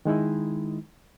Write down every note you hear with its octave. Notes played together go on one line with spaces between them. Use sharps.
D#3 G#3 D#4 E4